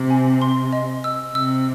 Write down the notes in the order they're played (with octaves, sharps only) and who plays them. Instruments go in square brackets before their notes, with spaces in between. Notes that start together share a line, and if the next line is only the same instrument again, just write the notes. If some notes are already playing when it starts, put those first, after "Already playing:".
Already playing: [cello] C3
[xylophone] G#5
C6
D#5
E6
[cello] C3 [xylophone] E6